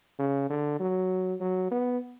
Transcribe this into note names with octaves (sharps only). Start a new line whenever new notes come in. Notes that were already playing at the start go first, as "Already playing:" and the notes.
C#3
D3
F#3
F#3
B3